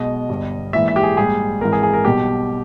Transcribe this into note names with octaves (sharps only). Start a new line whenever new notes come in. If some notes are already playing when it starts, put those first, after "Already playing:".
Already playing: B1 B2 G#3 D#5
G1 G2 G3
A#1 G#2 E3 E5
E5
G4
G#4
A#1 G#2 G3 G#4
G#1 G#2 E3 A#4
G#4
G#4
A#4
B1 B2 G3 G4